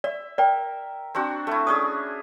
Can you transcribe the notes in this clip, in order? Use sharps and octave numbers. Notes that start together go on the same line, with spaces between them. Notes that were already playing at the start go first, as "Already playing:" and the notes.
D5 E5
A#4 D5 G5
C4 D4 F#4
A3 E4
C#4 D4 G#4 D#6